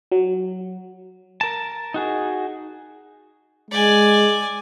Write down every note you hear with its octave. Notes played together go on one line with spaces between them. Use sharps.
F#3
A#4 A5
D#4 F#4 G#4
G#3 D5 G#5